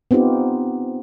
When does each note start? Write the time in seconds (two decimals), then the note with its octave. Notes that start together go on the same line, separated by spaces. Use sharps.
0.11 B3 C4 D#4 F4 G4